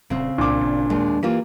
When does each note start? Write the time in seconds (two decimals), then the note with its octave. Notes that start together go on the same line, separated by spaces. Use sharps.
0.10 D#1 C#3 C4
0.38 C2 A#2 D4 D6
0.61 G#1
0.90 D#2 G#3
1.23 E3 A#3 F4 G4